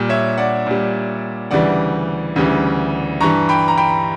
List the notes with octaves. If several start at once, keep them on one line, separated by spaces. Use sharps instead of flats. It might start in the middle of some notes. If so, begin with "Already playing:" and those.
Already playing: A#2 G3
C#5 E5
D5 F#5
A#2 G3
D2 C#3 E3 G3 D5 F#5
D2 C#3 E3 G3
G2 E3 G3 A#5 C#6
G5 B5
A#5
G5 B5